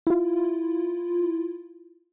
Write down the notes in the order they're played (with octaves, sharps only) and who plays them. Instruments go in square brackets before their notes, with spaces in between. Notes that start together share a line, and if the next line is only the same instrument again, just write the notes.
[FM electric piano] E4 F4